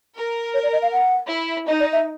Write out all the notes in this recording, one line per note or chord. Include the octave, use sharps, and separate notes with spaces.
A#4
C#5
D5
D#5
F5
F#5
E4
D#4 D#5
D5
E5